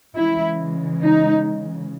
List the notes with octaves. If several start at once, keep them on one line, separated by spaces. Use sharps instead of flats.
C#3 E3 G#3 E4
D#4